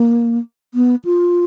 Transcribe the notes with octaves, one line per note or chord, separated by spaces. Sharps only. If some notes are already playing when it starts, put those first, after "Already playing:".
Already playing: A#3
B3
F4